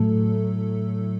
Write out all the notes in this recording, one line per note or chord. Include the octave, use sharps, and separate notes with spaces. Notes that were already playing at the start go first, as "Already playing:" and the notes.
Already playing: A2 F#3 A3 A4